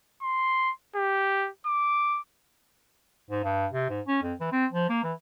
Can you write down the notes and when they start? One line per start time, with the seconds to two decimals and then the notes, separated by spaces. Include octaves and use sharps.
0.22 C6
0.96 G4
1.66 D6
3.30 G#2
3.44 G2
3.73 C3
3.90 G#2
4.07 C#4
4.23 F2
4.40 E3
4.52 C4
4.72 F3
4.89 A#3
5.04 E3